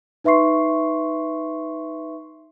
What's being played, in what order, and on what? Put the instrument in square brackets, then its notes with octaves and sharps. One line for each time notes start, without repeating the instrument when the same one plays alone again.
[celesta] D#4 B4 E5 C6 C#6 C7